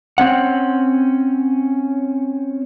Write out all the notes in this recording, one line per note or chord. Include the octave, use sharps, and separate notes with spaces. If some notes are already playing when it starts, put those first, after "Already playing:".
C4 C#4 F#5